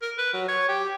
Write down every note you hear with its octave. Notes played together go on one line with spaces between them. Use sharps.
A#4
B4
F#3
C#5
G4